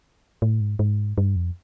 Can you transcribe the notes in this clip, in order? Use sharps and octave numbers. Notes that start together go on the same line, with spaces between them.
A2
G#2
G#2
G2
F2